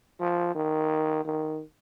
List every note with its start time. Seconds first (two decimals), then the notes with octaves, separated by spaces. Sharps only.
0.20 F3
0.55 D#3
1.25 D#3